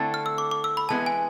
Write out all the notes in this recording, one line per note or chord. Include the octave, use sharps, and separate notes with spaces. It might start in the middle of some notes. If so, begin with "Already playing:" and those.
Already playing: D3 A3 C4 E4 A4
F6
E6
D6
D6
E6
B5
E3 G#3 B3 A5
G#5